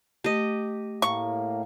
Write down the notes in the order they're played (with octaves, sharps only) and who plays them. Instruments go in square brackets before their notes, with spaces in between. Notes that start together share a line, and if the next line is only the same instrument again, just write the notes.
[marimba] A3 [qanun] G4 D#5
[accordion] A2 A#3 [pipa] C#6